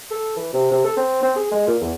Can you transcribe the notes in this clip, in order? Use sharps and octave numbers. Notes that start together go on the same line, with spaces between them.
A4
E3
C3
C3
A4
C4
C4
G#4
G#3
A#2
E2